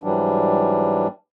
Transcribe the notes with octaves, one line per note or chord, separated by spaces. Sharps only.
G#2 E3 F#3 G3 D4